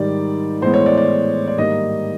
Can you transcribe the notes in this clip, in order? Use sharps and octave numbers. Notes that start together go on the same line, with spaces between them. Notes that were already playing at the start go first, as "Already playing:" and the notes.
Already playing: G#2 D#3 G3 D5
A2 E3 G#3 B3 C5
C#5
D5
D5
D5
G#2 D#3 G3 A#3 D#5